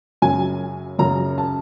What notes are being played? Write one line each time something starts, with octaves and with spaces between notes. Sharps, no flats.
F#2 C#3 F#3 G#5
F#2 C#3 F#3 A#5
A5